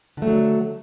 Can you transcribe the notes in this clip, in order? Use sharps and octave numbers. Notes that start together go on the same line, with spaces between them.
D3 F#3 A3 D4